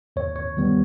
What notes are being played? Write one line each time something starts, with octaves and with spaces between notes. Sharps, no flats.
D#2 C#5
C#5
D#3 G3 B3